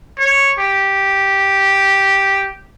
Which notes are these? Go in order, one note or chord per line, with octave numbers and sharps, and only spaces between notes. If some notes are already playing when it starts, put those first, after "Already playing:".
C#5
G4